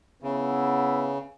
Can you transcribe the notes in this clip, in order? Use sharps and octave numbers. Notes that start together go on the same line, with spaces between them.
C#3 B3 E4